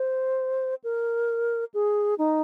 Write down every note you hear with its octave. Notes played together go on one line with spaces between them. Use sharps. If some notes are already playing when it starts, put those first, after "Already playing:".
Already playing: C5
A#4
G#4
D#4